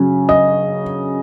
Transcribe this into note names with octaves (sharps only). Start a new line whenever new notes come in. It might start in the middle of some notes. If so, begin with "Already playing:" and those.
Already playing: C#3 F#3 C#4
D#5